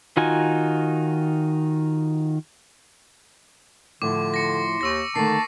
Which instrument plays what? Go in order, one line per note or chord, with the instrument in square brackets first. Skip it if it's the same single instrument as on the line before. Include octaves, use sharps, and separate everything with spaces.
[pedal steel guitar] D#3 D#4 F4 F#4 G#5
[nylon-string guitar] A2 F3 [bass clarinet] D3 [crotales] D6
[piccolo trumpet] C6 [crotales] A#6 C#7
[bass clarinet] D#2 [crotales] C#6 E6 A#6
[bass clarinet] D3 [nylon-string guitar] D#3 A3 [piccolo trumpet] A5 [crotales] C7